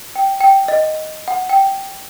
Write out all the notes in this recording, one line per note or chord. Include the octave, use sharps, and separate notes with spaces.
G5
G5
D#5
F#5
G5